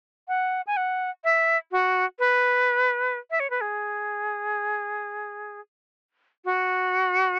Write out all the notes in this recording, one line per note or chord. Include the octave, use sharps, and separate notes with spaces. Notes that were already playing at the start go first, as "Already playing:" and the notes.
F#5
G#5
F#5
E5
F#4
B4
E5
C#5
B4
G#4
F#4